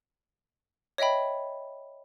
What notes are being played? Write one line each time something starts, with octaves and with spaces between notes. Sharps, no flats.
C#5 D#5 E5 G5 B5